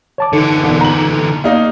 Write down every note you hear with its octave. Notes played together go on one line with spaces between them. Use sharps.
C#5 A5 D6
D3 E3 D#4 A4
E1
A#5 F#7
A#3 D#4